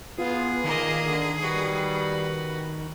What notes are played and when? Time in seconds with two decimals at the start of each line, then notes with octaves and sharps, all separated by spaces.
0.18 B3 F4 G#4
0.64 A#2 D#3 A#3 D#5
1.05 D3
1.42 G3 F#4 B4